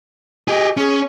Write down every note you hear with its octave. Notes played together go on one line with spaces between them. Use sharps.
G4 G#4 D#5
C#4 G#4